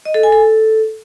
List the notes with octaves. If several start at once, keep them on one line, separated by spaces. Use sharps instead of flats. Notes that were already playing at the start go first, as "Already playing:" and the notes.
D#5
A4
G#5
A4